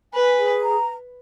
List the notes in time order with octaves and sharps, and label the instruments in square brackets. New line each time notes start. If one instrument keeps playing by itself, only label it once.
[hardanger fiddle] B4 [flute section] G#5
[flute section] G#4
A#5